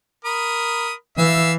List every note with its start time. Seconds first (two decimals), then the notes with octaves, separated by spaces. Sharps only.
0.25 A#4 B5 D#6
1.18 E3 E5 F5 E6